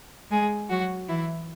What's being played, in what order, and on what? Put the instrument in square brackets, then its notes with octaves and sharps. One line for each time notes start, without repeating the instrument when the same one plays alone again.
[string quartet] G#3 G#4
F#3 F#4
E3 E4